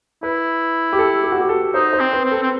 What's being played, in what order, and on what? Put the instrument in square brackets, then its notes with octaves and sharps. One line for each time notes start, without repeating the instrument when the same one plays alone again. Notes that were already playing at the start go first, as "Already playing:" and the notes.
[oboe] E4 [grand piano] B4
[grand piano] G4
A4
G4
F#4
G4
A4
[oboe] D#4 [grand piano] C5
[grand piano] C5
[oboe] C4
[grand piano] B4
[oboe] C4
[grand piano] A4
[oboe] C4